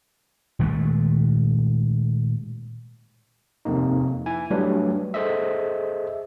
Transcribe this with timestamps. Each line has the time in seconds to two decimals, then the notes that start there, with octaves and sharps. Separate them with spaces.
0.59 A#2 D#3 G#3 A3
3.65 F2 C3 A#3 D#4
4.26 E4 G#5
4.50 F#3 G3 A3 D4 B4
5.14 G#4 A4 C5 D#5 E5